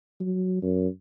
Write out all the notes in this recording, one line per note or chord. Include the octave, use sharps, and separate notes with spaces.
F#3
F#2